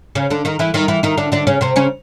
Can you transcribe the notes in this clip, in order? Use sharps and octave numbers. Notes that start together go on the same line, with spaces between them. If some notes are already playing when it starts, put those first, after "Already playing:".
C#3 C#4
D3 D4
D#3 D#4
E3 E4
D#3 D#4
E3 E4
D#3 D#4
D3 D4
D3 D4
C#3 C#4
C3 C4
C#3 C#4